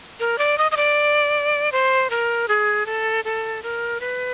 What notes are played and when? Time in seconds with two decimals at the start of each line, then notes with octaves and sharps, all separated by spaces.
0.20 A#4
0.38 D5
0.58 D#5
0.71 D#5
0.77 D5
1.72 C5
2.10 A#4
2.48 G#4
2.86 A4
3.25 A4
3.63 A#4
4.00 B4